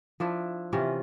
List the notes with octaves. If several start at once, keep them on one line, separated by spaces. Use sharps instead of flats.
F3 D4 E4
C3 E3 C#4 F4